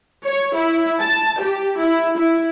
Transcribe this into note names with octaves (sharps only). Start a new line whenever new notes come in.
C#5
E4
A5
G4
E4
E4